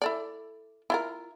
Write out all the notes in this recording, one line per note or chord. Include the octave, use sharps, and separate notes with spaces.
E4 A4 D5
E4 F4 A#4